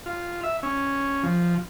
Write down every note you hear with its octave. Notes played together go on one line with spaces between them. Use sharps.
F4
E5
C#4
F3